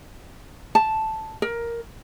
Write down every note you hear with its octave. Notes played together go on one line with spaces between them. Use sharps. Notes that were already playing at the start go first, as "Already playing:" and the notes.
A5
A#4